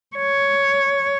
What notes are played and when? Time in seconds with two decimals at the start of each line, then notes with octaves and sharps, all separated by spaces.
0.17 C#5